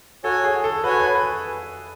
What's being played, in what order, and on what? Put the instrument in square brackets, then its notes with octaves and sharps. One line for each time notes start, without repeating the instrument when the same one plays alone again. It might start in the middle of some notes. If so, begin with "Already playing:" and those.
[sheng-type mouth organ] F#4 C#5 G#5 [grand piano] A4
[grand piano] G#4
A4
[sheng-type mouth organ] F#4 C#5 G#5 [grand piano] B4
[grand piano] B4
B4